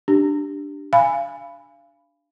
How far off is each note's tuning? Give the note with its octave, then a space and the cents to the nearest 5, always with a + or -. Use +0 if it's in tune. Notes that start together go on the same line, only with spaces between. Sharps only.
D4 +0 G4 +0
F5 -25 G#5 -10 B5 +0